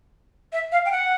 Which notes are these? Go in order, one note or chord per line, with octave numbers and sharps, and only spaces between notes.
E5
F5
G5
F#5